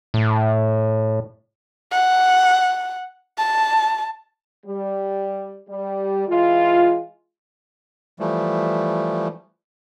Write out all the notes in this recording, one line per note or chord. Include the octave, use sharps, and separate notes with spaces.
A2
F#5
A5
G3
G3
E3 G#3 F4
E3 F3 G3 A3